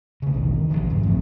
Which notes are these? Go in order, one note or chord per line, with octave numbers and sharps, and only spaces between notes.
C#3 A3
A#1 D#2 B2 D#3
D#3
A1 G#2 E3 F3
D#2 G#2 C#3 F3
G1 F2 A3 C4